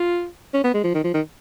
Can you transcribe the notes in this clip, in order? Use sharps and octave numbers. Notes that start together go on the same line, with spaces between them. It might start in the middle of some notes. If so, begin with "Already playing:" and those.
Already playing: F4
C#4
B3
G#3
F3
D#3
F3
D#3